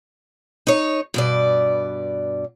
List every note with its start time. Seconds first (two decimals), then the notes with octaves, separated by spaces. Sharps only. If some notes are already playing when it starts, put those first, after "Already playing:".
0.67 D#4 C#5
1.14 G2 B2 D5